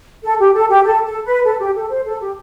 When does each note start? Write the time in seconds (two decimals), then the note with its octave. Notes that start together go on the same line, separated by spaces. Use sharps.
0.23 A4
0.40 G4
0.54 A4
0.70 G4
0.85 A4
1.05 A4
1.25 B4
1.45 A4
1.59 G4
1.75 A4
1.91 C5
2.06 A4
2.21 G4